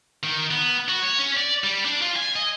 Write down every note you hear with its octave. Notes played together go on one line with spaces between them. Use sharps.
D#3
B3
F#4
C#5
C#4
D5
G3
D4
F4
G#5
D#5